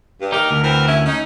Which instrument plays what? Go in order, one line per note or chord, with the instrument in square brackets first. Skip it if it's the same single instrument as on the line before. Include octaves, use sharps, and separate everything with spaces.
[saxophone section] G2
[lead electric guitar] D#4 G4 [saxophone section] A#4
[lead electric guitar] D2
[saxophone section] E3 C4 A#4
C#4 E4
C#4 D#4